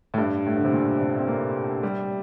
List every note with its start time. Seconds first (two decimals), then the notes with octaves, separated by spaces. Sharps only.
0.14 A2
0.18 G2
0.46 A2
0.57 D3
0.65 C3
0.73 A#2
1.00 C3
1.19 C4
1.28 A#3
1.83 G3